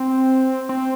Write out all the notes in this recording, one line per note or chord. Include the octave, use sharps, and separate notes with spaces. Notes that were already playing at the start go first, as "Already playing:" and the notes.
Already playing: C4
C4